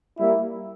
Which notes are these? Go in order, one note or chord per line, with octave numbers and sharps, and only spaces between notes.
G3 A#3 E4